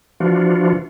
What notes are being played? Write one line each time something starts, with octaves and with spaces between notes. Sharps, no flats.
E3 F3 D4 F4 F#4